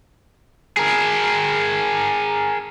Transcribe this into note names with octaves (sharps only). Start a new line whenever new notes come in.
G#4 A#4